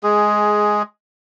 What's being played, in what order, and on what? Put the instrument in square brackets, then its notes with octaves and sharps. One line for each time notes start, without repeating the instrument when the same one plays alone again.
[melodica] G#3 G#4